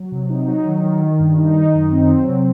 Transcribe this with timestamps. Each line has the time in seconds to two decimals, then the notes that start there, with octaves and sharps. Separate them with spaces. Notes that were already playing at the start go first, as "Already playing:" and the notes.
Already playing: F#3
0.12 C3
0.30 D#4
0.48 F#3
0.65 D#3
0.84 D#3
1.02 D#3
1.19 G2
1.38 D#4
1.55 D#3
1.74 F#2
1.92 C4
2.09 F#3
2.28 C3